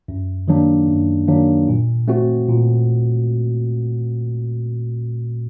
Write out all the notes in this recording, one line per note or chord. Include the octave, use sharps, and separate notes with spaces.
F#2
D#3 F#3 A#3 D4
F#2
D#3 F#3 A#3 D4
A#2
A3 C4 F#4
A#2